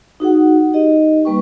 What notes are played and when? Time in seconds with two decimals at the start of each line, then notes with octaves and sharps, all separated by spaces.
0.20 D#4 F#4 G#4 F#5
0.73 D#4 G4 D#5
1.25 G3 A#3 B4 G5 C#6